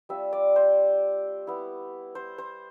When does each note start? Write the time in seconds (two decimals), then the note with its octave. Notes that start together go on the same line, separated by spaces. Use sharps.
0.09 G3 C4 F4 E5
0.33 D5
0.56 C5
1.47 B3 E4
2.15 C5
2.38 C5